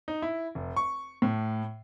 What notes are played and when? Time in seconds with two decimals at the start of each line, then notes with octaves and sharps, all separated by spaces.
0.08 D#4
0.22 E4
0.55 F1
0.77 C#6
1.22 A2